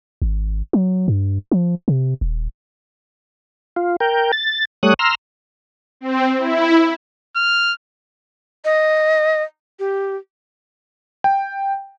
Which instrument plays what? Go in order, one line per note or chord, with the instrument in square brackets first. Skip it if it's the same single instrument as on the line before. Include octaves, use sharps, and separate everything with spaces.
[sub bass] G#1
F#3
G2
F3
C3
D#1
[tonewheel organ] F4
A#4 G5
A6
G3 A3 C#5 D#6 F#6
A#5 C6 E6 F6
[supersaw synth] C4
E4
[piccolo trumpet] F6
[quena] D#5
G4
[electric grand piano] G5